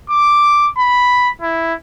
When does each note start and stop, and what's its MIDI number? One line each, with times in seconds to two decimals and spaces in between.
0.10 0.67 86
0.78 1.29 83
1.41 1.74 64